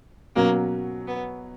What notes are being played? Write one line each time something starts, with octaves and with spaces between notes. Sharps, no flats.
B2 F#3 A#3 C#4 F#4
B3